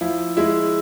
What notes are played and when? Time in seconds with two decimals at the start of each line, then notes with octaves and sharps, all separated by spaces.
0.01 F3 E4
0.37 G#3 E4